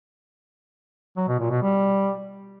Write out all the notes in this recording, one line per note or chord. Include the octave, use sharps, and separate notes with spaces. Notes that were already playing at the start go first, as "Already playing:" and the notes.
F#3
B2
A#2
B2
G3